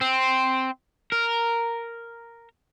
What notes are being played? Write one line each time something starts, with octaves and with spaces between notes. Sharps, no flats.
C4
A#4